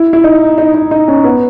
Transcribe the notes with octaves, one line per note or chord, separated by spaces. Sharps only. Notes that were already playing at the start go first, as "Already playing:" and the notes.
Already playing: E4
E4
D#4
D#4
D#4
D#4
C#4
B3